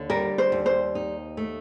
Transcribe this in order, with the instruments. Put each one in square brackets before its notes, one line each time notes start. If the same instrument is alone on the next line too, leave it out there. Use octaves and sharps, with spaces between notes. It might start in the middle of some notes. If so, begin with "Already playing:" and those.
Already playing: [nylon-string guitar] D#2 D3
[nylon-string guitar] G3 [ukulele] A#4
[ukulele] C5
[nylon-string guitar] D#2
[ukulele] C5
[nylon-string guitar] D#4
A3